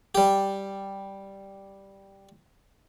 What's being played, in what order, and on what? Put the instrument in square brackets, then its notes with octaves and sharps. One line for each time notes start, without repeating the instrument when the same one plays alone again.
[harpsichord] G3 G4